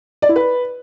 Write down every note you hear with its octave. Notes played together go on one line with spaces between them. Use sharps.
D5
E4
B4